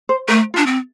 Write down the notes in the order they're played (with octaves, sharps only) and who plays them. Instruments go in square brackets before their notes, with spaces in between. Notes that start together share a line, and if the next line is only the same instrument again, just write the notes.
[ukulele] C5
[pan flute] A3 [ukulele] A#4
[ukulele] F4
[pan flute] D4
C4